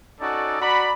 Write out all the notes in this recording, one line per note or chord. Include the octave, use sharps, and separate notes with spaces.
C#4 D#4 F#4 A4 D5
F#4 D5 A#5 B5